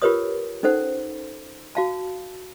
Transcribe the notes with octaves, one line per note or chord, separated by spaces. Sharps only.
F4 G4 A#4 B4 C#5 D#6
C#4 D#4 A4 C5 F#5
F#4 F5 A5